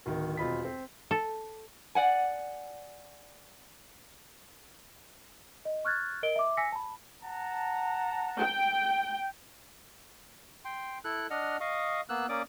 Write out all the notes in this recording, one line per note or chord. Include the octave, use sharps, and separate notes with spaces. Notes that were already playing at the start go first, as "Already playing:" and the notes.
D1 D#3
E1 C4 F4 D#5 B5 B6
C4
A4
D5 F#5 G#5
D#5
C#6 F6 F#6 G#6 A6
A#4 D#5 D7 G7
E5 D6
G#5 E6 A#6 B6 C#7
A5 B5
F#5 A5 A#5
G5
G5 C6
E4 A4 F#6
D4 D#5 F#5 F6
D#5 F5 C#6 D#6
A#3 B3 E6 F#6
A#3 C#4 D5 D6 D#6